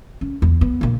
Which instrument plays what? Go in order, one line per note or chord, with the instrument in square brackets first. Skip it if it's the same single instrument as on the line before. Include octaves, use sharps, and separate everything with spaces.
[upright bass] C#4
E2
B3
A#1 A#3